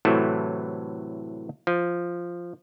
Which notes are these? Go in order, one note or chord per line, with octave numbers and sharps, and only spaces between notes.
A2 C3 E3 F#3 A3
F3